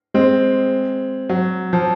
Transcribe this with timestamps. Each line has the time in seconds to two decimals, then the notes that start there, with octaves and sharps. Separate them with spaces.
0.14 G#3 C4
1.29 F#3
1.73 F3